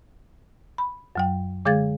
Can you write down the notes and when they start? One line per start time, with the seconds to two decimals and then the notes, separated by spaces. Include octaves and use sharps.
0.78 B5
1.15 F#2 F#3 G5
1.65 D3 G#3 G#4 F5 G#6 A6